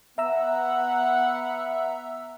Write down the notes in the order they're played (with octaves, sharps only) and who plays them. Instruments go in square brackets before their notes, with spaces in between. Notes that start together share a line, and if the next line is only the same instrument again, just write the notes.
[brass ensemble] B3 F#5 [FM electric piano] E5 A#5 E6